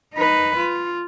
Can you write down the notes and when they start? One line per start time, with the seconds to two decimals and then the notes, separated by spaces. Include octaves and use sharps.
0.15 D#4 B4
0.57 F4